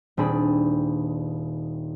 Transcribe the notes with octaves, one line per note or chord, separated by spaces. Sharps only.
D#1 C4 D4 G#4 B5